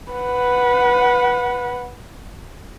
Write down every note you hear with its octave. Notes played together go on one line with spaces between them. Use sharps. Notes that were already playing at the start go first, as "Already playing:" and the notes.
B4 F#5